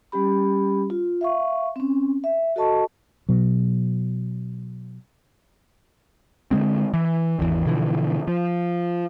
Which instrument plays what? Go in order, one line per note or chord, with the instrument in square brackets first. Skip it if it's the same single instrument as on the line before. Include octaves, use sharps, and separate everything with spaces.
[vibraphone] G3 C#4 G4 B5
F4
E5 F5 C#6
C4 C#4
E5
F#4 A4 D#5 A5 C#6
[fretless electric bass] B2 F#3
[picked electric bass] D3 D#3 G#3 C4
E3
G#1 E2 E3
B2 D3 E3 F3
F3